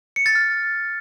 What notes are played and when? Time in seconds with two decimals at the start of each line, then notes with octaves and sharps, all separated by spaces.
0.16 C#7
0.26 A6
0.35 F6